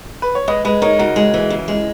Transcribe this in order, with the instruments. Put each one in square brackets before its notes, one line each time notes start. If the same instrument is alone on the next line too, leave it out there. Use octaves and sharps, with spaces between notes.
[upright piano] B4
C#5
[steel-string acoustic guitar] G#3 [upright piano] B4 D#5
[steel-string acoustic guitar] G#3 [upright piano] B4 D#5
[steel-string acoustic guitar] D#4 [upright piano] A#4 C#5
[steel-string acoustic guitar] C#3 [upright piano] F#4 A#4
[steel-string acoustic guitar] G#3
E3
C#3
G#3